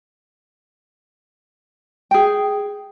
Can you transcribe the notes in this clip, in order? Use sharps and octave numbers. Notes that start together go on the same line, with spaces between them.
G#4 G5